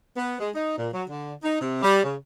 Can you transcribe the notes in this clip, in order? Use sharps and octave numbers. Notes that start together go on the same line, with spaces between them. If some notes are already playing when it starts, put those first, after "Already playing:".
B3
G#3
D#4
A#2
F#3
D3
D#4
C3
G3
C#3